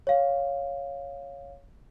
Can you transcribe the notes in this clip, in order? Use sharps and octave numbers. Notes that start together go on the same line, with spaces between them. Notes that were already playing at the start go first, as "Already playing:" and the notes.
C#5 F5